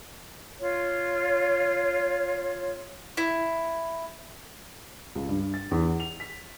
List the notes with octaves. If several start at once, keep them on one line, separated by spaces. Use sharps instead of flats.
F4 C#5
E4
C#2
G2
A6
E2
F7
B6